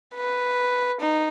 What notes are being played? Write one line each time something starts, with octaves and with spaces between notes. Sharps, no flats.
B4
D#4